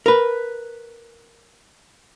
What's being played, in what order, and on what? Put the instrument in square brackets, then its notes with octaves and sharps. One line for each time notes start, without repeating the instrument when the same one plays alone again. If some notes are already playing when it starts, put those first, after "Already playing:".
[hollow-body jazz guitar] A#4 B4